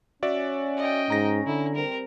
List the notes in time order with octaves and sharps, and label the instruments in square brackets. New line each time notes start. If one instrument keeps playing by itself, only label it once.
[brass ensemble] C#4 [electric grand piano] F#4 D5 E5
[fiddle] D#5 G5
[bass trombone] G#2 [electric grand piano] A#5 A#6
[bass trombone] D3 [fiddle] E4
[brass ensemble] G3 C4 [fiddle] A#4